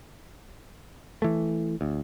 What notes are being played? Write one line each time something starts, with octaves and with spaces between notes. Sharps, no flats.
E3 A3
D2